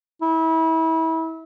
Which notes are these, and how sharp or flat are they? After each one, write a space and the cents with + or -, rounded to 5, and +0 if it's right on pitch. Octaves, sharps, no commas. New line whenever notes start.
E4 -30